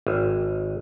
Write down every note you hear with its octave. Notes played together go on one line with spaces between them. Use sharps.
G#1